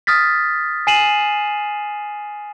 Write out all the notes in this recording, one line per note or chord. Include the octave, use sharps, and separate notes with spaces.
D#6 F6 A6 B6
G#5 C7 D#7 E7 F#7